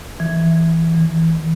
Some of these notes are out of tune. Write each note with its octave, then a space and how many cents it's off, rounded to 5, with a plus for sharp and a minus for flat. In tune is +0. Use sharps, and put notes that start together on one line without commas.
E3 +0
E3 -35